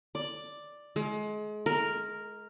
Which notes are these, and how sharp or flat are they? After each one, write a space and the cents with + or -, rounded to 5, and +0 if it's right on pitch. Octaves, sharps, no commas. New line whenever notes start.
D5 +5
G#3 +30
A#4 -5